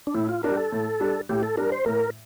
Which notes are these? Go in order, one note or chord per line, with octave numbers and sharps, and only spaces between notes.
D4
A2 E4
F4
G3 D4 A#4
G4
A4
A2
G3 D4
A2 G4
A4
G3 D4 A#4
C5
A2 A#4